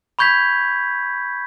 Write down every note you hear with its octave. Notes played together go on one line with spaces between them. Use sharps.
B5 C#6 G6 G#6 B6